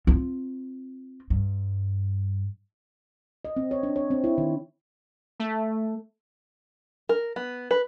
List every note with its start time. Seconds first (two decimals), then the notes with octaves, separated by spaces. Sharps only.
0.07 C4 F4
1.30 G2
3.45 D#5
3.56 C4
3.71 C#5
3.83 D4
3.96 C#5
4.11 C4
4.24 E4
4.38 D#3
5.40 A3
7.09 A#4
7.36 B3
7.71 B4